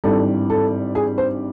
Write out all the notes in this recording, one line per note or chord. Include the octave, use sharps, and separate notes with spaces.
G#1 G2 E3 G3 A4
A4
G#4
C5